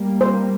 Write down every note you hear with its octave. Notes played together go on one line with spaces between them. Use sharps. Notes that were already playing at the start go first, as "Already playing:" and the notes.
Already playing: G3 A#3
C5